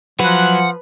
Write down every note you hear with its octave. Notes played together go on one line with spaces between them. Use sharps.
F3 F#3 B4 F#5